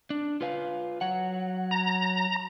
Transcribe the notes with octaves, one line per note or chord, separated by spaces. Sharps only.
D4
F4 B4 F5
F#3 F#5
A#5